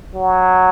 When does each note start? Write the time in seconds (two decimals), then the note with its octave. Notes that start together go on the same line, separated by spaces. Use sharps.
0.15 F#3